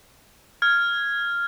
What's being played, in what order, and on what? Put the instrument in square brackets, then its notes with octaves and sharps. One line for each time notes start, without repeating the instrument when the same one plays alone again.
[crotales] F6 G#6